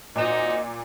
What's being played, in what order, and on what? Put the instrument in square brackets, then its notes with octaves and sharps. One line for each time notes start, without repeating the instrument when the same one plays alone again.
[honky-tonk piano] A#2 E7 [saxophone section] C4 D#4 F#4 [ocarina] D#5